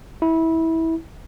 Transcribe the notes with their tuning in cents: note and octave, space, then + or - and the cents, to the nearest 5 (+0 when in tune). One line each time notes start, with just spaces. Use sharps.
E4 -20